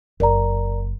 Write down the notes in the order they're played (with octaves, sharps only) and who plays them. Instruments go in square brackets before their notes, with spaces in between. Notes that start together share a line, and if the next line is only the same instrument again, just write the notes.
[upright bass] F#1 [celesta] A#4 D5 A#5